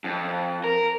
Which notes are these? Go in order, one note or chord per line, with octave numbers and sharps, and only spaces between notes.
F2
A#4